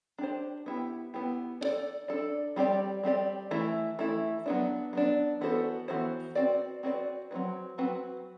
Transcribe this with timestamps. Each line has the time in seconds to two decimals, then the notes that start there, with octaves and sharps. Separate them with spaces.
0.18 D4 G4 C5
0.66 B3 E4 G4
1.14 B3 E4 G4
1.61 D4 A4 D5
2.08 D4 A4 D5
2.56 G3 C4 G4 D5
3.03 G3 C4 G4 D5
3.51 E3 A3 E4
3.99 E3 A3 E4
4.46 F#3 B3 D4
4.93 F#3 B3 D4
5.41 E3 B3 F#4 A4 C5
5.88 E3 B3 F#4 A4 C5
6.35 C4 F#4 B4 D5
6.83 C4 F#4 B4 D5
7.31 F#3 C4 F#4 B4
7.78 F#3 C4 F#4 B4